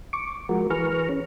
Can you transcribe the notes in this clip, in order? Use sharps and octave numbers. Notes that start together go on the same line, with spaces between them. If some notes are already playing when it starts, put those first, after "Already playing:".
C#6 D6
F3 G#3 F#4 A#4
E3 G#4 B4 A#5 C#6 F6
C#4